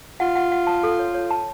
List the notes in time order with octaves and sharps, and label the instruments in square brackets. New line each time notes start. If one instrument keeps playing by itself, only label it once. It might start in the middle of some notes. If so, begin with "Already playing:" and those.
[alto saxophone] F4 [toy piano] F#5
[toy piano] F#5
F#5
A5
A4
C#5
C#5
A5